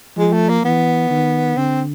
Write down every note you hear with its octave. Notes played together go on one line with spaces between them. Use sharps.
F3 G#3
A3
A#3
E3 B3
D#3
D3 C4